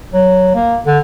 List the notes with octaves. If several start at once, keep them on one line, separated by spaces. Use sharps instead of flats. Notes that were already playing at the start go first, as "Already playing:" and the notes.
F#3
A#3
D3